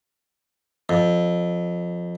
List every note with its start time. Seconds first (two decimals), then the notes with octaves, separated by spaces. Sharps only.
0.89 F2